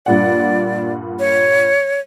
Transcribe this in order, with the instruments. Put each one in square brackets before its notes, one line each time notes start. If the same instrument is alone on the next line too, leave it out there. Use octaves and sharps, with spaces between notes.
[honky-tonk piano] G2 A#2 F#5 [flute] D5
[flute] C#5